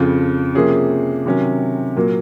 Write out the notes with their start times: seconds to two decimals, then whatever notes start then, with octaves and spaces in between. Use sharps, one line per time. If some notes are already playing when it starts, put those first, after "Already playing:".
Already playing: F2 C#3 F3
0.55 C3 F3 A#3 C#4 G#4
1.26 C3 D#3 F#3 C#4
1.96 A#2 F#3 A#3